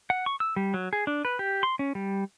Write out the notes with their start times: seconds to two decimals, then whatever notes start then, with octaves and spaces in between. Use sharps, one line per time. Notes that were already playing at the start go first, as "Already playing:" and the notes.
0.10 F#5
0.26 C#6
0.40 E6
0.56 G3
0.74 F#3
0.93 G#4
1.07 D4
1.25 B4
1.39 G4
1.63 C6
1.79 C#4
1.95 G3